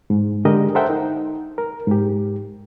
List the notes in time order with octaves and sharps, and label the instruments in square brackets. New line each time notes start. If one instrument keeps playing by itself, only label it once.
[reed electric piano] G#2
D3 G#3 G4 A#4 D#5
A4 A#4 C5 E5 F#5 G5
D#4
A#4
G#2 G4